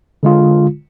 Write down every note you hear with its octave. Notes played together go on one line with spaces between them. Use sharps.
D3 G#3 F4